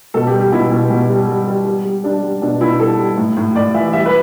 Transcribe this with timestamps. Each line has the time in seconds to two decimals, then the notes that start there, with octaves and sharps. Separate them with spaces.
0.14 B2 A4
0.27 G4
0.34 G3
0.40 G4
0.52 B2 E4
0.71 B2
0.90 B2
1.10 G3
1.28 G3
1.47 G3
1.66 G3
1.85 G3
2.04 G3 D4
2.23 G3
2.42 B2 D4
2.61 B2 E4
2.80 G3 A4
2.98 G3
3.17 A2
3.37 A2
3.55 A2 D5
3.74 E3 E5
3.93 G3 E5
4.06 B4